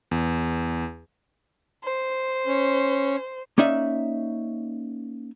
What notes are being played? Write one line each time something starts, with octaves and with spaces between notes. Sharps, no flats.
E2
C5
C#4
A#3 C#4 D#4 D5 E5